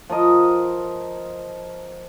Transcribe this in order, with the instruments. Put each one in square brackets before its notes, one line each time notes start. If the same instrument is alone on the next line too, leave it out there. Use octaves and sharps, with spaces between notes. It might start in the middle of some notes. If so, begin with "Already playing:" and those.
[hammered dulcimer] F3 A#4 D#5